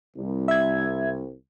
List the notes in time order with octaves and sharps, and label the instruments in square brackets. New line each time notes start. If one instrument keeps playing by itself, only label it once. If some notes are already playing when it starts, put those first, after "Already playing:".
[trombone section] C2
[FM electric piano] E5 G#6